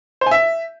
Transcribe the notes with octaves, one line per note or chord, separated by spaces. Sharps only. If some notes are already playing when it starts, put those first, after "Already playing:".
C5
G#5
E5